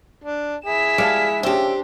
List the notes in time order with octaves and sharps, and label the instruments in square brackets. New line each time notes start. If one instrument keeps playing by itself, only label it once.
[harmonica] D4
[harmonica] E4 G#4 [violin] B6 E7
[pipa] G3 F5 A5 [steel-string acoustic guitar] G#3
[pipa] C#3 F3 E5 [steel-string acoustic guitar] C4 G4 [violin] D4